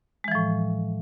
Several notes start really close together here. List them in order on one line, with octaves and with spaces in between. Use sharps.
G#3 E3 F3 A2